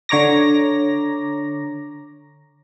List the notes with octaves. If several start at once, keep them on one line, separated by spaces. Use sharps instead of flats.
D3 C#5 A#5 D6 A#6